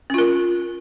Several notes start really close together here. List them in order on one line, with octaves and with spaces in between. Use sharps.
C#4 F4 A#4